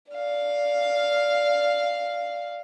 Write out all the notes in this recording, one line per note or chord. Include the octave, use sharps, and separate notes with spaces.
D5 F5